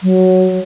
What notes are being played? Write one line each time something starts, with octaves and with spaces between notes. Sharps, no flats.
F#3